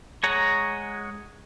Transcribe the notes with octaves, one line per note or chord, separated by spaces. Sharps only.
G#3 G#4 C#5 F#5 A#5